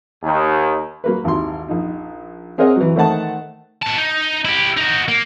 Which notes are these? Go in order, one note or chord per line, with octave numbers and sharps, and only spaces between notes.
D#2
F#3 A#3 B4
G#1 D#2 E4 C6
A#1 D#4
C4 G#4 A#4 C#5 D#5 F#5
E3 F#3
D#3 A3 C5 D#5 F#5 A5
B3 A5
D#4
E4 G4
D#4 F#4
A#3